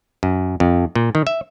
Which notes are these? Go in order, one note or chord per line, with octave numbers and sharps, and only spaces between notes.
F#2
F2
A#2
D#3
E5